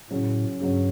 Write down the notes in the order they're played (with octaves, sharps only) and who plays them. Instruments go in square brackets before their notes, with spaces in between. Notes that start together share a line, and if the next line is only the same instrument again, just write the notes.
[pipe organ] A2 [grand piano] C#3 F#3 C#4
[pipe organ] G2 [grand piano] C#3 F#3 C#4